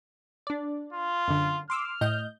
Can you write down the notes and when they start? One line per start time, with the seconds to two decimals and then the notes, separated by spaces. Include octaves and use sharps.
0.47 D4 D5
0.93 F4
1.28 F#2 D3
1.70 C6 D6 E6 F6
2.01 A2 D#5 G6